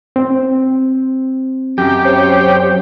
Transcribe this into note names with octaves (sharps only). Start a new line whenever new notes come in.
C4
F#2 G4
C5 C#5 G5